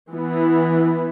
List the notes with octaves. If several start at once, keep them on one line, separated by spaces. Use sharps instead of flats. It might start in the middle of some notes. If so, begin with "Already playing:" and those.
E3 B3 E4